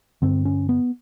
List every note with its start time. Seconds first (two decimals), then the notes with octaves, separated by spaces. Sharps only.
0.22 G2 D3 C4
0.45 C#4
0.69 B3